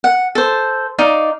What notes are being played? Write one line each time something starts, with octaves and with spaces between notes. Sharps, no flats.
F#5
A4 C5
D#4 D5 F5